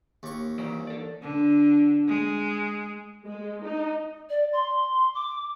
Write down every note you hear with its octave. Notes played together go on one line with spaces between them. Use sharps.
D#2 C#6
E3 C5 D5
A4 D5
D3
G#3
G#3
D#4
D5
C6
D6